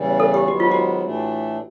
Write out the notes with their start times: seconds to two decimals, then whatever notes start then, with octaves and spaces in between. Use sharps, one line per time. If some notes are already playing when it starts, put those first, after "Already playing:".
Already playing: E2 C#3 E3 G3
0.20 A4
0.34 G4
0.48 G#2 D#3 F#3 B3 F#4
0.60 F4
0.71 F#4
1.03 A2 E3 A3 D4